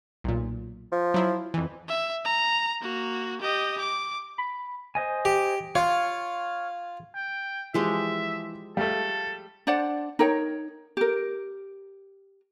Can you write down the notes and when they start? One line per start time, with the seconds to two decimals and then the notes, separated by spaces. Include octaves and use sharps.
0.24 B1 A#2
0.92 F3
1.14 F#3 E4 F4
1.54 F2 E3
1.88 E5
2.25 A#5
2.82 A#3 F#4
3.41 G4 D#5
3.80 D6
4.38 B5
4.95 C5 D#5 G#5
5.25 G4
5.75 F4 C#5 F5
7.15 G5
7.74 E3 F3 G#3 G4 E5
8.77 G3 A3 A4 F5
9.67 D4 C5 D5 F#5
10.19 D#4 A#4 C#5 G5
10.97 G4 A#4